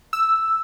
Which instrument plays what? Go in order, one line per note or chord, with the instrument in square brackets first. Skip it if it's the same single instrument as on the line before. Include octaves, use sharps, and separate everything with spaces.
[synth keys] E6